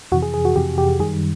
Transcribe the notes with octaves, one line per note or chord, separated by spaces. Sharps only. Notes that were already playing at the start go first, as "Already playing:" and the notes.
F2 C3 E3 F#4
G#4
G#4
F#4
F2 C3 E3 G4
G4
F#2 D#3 G3 G#4